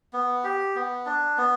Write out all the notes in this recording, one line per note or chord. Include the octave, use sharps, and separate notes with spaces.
B3
G4
B3
D4
B3